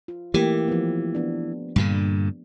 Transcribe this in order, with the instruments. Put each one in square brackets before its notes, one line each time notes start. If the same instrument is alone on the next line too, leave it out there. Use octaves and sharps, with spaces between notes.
[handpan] F4
[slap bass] E3 [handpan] A3 A#3 G4
[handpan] F3 B3
B3 D4
[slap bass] G2 A#2 D3